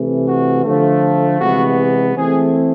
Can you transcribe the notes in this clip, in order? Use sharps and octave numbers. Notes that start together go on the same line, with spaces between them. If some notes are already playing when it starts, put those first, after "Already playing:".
Already playing: C3 E3 A3
F#4
D3 F3 A3
C3 E3 G#3 B3 F#4
E3 A3 C4 G#4